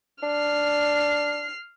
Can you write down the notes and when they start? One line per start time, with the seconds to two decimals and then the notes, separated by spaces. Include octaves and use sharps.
0.23 D4 F6 C7